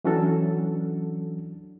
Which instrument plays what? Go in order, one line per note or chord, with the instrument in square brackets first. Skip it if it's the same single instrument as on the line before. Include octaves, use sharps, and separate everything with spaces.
[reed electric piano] E3 F#3 C#4 D4 F#4 A4